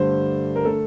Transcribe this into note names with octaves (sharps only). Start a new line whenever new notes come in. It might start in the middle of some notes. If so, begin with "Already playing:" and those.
Already playing: G2 D3 A3 C5
A#4
D3 A3 A4